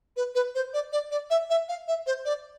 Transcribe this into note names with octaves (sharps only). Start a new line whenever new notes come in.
B4
B4
C5
D5
D5
D5
E5
E5
F5
E5
C5
D5